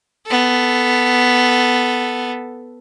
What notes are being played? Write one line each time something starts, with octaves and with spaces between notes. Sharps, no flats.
B3 A4